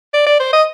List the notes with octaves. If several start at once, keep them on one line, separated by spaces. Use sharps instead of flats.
D5
D5
C5
D#5